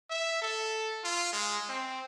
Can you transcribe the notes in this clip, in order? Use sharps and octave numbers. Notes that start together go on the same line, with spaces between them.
E5
A4
F4
G#3
C4